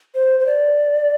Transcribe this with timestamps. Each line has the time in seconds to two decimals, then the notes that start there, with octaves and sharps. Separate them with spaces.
0.15 C5
0.40 C5
0.46 D5